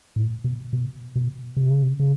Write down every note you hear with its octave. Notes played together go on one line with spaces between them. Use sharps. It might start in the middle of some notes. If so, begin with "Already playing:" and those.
A2
B2
B2
B2
C3
C#3
C3
C#3